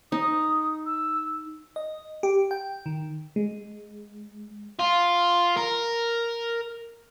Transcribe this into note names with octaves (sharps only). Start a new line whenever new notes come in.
D#4 D#6
E6
D#5
G4
G5
D#3
G#3
F4
A#4